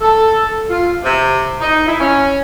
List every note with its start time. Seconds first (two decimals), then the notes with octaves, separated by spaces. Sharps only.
0.01 A4
0.70 F4
1.03 C3
1.61 D#4
1.87 E4
2.00 C#4